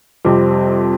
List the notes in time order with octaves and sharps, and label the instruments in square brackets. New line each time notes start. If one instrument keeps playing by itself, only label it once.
[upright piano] F2 C3 G3 C4